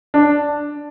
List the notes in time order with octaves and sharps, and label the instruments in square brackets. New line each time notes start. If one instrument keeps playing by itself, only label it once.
[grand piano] D4